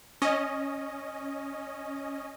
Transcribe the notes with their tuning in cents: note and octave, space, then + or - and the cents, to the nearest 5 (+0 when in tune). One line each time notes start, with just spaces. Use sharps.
C#4 +0 D#5 +0